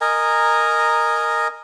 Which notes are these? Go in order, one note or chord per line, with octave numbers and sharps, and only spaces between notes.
A#4 D#5 G#5 A#5